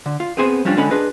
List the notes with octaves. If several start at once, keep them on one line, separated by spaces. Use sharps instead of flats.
D3
F4
B3 C4 G#4 C5 G#5
F3 G3 C#4 D4 F4 G4
D3 G#3 C#4 F#5 B5
D4 F4 G#4 B4 D#5